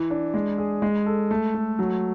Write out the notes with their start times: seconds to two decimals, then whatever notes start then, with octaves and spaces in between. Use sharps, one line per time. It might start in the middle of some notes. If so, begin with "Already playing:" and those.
Already playing: E3
0.10 D4
0.34 G#3
0.58 G#4
0.82 G#3
1.06 A4
1.31 A3
1.54 A3
1.79 F#3